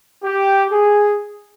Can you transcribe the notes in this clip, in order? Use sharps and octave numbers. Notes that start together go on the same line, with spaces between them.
G4
G#4